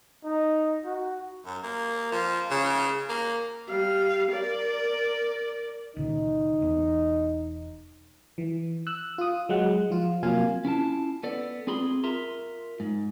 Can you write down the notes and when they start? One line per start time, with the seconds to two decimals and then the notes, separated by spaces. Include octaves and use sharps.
0.24 D#4
0.85 F#4
1.45 F#2
1.63 A#3
2.12 F3
2.50 C#3
3.10 A#3
3.68 G3 F5
4.32 A#4 D5
5.97 C#2 A#2 D#3 D#4
6.61 E1 E2 B3
8.38 E3
8.87 E6 F#6
9.18 F4 D#6
9.49 F#3 G#3 F#5
9.90 F3 F4
10.23 C3 F#3 A#3 F4 F5 G#5
10.65 C#4 E4 F4 A5
11.23 B3 A4 D5
11.67 C4 F4 G#4 B5 C6
12.04 F4 A#4 E5 A#5 C6
12.80 G#2